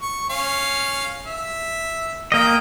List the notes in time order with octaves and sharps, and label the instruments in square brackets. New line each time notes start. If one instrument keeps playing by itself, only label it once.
[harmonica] C#6
C#4 F5
E5
[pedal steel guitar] A#3 D#5 [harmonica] G5